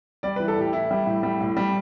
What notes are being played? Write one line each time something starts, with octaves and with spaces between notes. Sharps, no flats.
G3 D5
E3 B4
A4
A2 G4
E3 E4
G3
A2
G3
A2
G3